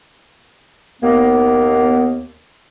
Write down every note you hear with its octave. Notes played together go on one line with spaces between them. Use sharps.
D#2 A#3 B3